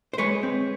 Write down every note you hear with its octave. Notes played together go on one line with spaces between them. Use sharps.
C5
G#3 B4 C#5
C4